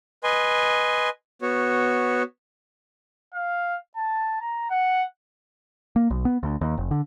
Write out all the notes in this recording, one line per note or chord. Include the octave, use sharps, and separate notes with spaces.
B4 D#5 G#5 C6
B3 F#4 C#5
F5
A5
A#5
F#5
A#3
B1
B3
D2
D#2
F1
D3